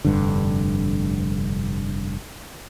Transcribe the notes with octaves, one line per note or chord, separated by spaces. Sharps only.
F1 G2 D3